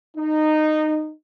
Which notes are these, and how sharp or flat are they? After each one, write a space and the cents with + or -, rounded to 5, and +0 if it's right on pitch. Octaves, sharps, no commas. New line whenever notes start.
D#4 -15